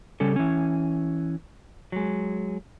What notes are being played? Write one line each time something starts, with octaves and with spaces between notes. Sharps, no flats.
C#3 G3 C#4 A4
E3 C#4
F#3 G#3